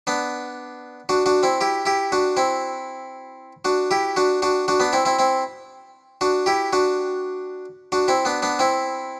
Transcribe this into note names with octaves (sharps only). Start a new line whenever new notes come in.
B3 D4
D4 F#4
D4 F#4
C4 E4
E4 G4
E4 G4
D4 F#4
C4 E4
D4 F#4
E4 G4
D4 F#4
D4 F#4
D4 F#4
B3 D4
C4 E4
C4 E4
C4 E4
D4 F#4
E4 G4
D4 F#4
D4 F#4
C4 E4
B3 D4
B3 D4
C4 E4